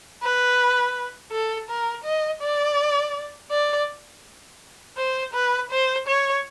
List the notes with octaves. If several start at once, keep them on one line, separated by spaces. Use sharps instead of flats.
B4
A4
A#4
D#5
D5
D5
C5
B4
C5
C#5